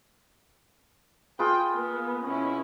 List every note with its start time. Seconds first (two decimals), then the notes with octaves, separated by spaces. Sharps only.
1.39 F4 G#4 B4 G5
1.71 A#3 B3
2.24 B2 C#4 E4